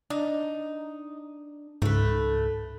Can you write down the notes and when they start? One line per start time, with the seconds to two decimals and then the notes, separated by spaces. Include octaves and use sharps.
0.10 D4 D#4
1.82 C#2 G#2 A3 B4